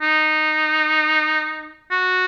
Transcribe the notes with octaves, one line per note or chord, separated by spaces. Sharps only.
D#4
F#4